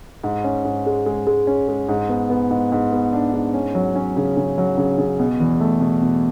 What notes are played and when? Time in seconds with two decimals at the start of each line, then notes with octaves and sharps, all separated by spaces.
0.24 G#2
0.44 C#4
0.65 G#2
0.86 G#3
1.06 G#3
1.27 G#3
1.47 C#4
1.68 G#3
1.89 G#2
2.09 B3
2.30 B3
2.51 G#2
2.72 G#2
2.92 B3
3.13 D4
3.34 G#2
3.54 C#4
3.75 F#3
3.96 C#4
4.17 C#3
4.37 C#3
4.58 F#3
4.78 C#3
4.98 C#3
5.20 B2
5.40 E2
5.60 A3
5.81 B2
6.02 B2